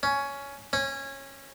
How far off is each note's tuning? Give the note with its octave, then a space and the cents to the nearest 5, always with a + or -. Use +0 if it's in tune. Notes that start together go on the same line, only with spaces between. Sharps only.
C#4 +10
C#4 -20